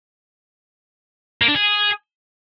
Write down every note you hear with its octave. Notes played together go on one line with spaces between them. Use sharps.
A#3
D4
G#4